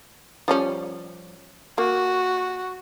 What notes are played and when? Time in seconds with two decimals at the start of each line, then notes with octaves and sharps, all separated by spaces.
0.48 F3 G3 C#4
1.78 A#3 F#4